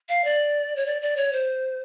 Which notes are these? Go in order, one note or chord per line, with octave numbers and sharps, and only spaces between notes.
F5
D5
C#5
D5
D5
C#5
C5